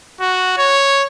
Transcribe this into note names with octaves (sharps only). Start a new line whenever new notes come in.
F#4
C#5